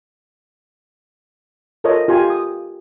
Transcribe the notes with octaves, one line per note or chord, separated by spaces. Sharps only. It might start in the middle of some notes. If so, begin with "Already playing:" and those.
F4 A4 A#4 C5 C#5 D#5
F4 G4 F5 G#5 A#5
D#6